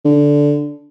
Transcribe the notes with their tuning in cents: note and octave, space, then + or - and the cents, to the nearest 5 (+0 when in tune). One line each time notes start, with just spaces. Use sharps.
D3 -10